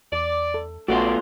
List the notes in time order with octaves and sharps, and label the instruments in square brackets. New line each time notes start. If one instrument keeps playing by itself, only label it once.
[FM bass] E2 [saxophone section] D5
[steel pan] A4
[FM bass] A#1 [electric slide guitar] A3 B3 F4 [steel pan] F#4 [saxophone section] D5